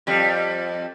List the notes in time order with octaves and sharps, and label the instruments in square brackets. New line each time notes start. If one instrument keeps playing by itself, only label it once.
[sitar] F2 G3